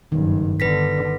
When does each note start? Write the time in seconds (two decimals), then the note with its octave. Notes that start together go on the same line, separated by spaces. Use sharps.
0.12 F#1 G2 D#3
0.60 G1 D3 B4 A#6 B6